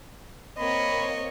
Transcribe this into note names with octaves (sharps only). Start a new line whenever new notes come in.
A#3 C4 C#5 D#5 B5